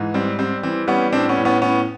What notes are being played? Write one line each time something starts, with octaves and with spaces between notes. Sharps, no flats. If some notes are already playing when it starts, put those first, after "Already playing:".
Already playing: G#2 E3
G3 C4
G3 C4
E3 C4
G3 B3 C#4
A2 C4 D4
B3 C#4
A2
B3 C#4
A2 B3 C#4